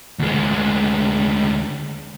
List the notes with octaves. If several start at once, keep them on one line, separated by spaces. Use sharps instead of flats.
D2 G#3